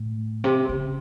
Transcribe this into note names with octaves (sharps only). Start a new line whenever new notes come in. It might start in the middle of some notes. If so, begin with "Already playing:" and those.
Already playing: A2
C3
C#3